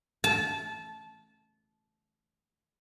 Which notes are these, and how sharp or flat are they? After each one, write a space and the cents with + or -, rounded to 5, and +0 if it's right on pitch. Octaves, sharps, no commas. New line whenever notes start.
A5 -20